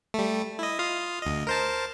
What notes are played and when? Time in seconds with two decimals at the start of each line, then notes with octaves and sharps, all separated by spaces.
0.14 G3 A3
0.59 E4 D#5
0.79 F4 F5 D#6
1.22 D2 D#5
1.47 A#4 C5 A5